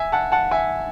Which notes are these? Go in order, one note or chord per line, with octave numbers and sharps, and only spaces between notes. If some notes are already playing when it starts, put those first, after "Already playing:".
Already playing: E5 G#5
F#5 A5
F#5 A5
E5 G#5